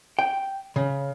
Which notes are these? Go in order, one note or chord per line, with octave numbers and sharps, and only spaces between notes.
G5
C#3